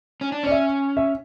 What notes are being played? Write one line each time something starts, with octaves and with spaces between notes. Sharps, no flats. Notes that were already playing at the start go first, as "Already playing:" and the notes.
C#4
D4
C#4 D5
E5
E5